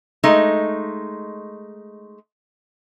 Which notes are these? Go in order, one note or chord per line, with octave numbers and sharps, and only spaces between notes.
G#3 A3 D#4